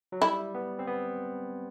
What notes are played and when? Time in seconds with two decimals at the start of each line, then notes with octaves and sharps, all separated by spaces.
0.12 F#3
0.22 G3 E4
0.55 B3
0.79 C4
0.87 B3